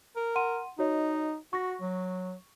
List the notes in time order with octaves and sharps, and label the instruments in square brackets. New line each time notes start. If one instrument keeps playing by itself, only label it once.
[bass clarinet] A#4
[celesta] F#5 C6 D#7
[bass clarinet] D#4 [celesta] F#4 C#5 D#5
[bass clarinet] F#4 [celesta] C#6 A#6
[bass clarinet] F#3